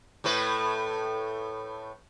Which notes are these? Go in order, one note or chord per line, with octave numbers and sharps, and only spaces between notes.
A2 A3 B4